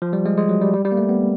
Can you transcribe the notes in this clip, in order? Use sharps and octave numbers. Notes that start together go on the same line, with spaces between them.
F3
G3
G#3
G#3
F#3
G3
G3
G3
A#3
A3
B3